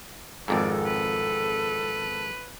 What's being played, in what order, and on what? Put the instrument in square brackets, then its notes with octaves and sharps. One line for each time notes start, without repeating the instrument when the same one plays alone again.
[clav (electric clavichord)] G#1 F2 G#2 [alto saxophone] A4 [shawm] D5
[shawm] B4